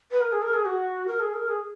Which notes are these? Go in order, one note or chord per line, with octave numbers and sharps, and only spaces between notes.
B4
A#4
G#4
A#4
G#4
F#4
A#4
G#4
A#4
G#4